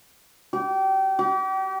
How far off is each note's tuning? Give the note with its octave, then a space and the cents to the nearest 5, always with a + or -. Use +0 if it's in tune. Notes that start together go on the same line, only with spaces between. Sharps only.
G4 -30
G4 -40